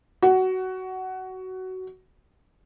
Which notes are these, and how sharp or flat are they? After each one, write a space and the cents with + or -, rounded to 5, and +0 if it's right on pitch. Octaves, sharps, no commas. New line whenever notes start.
F#4 +15